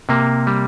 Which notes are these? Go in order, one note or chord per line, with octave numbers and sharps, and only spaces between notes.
C3 A#3
G3